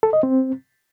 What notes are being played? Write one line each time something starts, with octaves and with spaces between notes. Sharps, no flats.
A4
D#5
C4